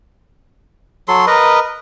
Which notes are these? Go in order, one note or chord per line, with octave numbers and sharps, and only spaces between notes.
F#3 A4 C6
A#4 B4 D#5